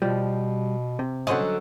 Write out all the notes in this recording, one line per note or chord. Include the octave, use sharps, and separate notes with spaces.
B2 F3 G3
C3
D3 F#3 C#4 C5 D#5 F#5